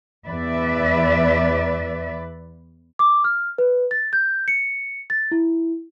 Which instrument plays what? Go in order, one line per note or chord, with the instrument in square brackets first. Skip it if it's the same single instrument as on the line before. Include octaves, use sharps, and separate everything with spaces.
[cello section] E2 B4 D5 E5
[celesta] D6
F6
B4
A6
G6
C#7
A6
E4